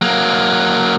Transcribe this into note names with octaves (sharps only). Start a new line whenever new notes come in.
F#3 A#3